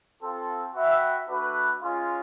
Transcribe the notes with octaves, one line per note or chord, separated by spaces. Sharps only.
C4 F4 A4
F#4 B4 E5 G5
A3 D4 F#4 B4
G#3 C#4 F4